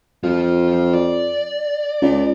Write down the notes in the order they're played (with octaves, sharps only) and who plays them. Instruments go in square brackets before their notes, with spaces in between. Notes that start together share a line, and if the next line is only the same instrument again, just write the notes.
[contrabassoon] F2 [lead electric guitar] F3 F4
[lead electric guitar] D5
[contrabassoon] C#2